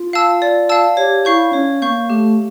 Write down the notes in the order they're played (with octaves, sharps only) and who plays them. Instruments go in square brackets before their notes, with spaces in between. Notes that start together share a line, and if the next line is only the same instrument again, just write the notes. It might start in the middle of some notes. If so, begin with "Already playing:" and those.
Already playing: [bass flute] F4
[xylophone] F5 A5 E6
D5
F5 A5 E6
[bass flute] G4 [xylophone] C#5
[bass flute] E4 [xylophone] F5 C#6 G6
[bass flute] C#4 [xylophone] C#5
[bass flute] A#3 [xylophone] F5 C#6 G6
[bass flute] A3 [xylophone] G4